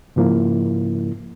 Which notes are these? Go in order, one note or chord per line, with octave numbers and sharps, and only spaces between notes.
G#2 C#3 F3 A#3 E4